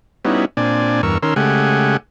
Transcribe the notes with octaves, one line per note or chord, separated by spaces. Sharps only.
G3 B3 C#4 D#4 E4 F#4
A#2 C4 D4 D5 G#5
E2 G2 A#4 C#6 E6
D#3 C#4 A#4 C6 E6
C#3 G#3 A3 G4 F#5 G#5